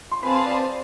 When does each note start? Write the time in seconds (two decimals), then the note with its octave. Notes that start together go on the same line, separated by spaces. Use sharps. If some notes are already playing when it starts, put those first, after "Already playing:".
0.11 C6
0.23 C4 G#4 B4 F5 A5 B5
0.35 C6
0.46 D5
0.58 C5